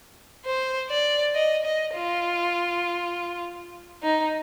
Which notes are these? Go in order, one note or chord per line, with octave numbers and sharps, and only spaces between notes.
C5
D5
D#5
D#5
F4
D#4